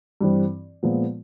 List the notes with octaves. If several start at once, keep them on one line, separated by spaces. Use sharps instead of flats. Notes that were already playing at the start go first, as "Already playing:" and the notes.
G2 E3 G3 C4
A#2 F3 G#3 B3